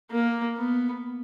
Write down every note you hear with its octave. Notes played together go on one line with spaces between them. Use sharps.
A#3
B3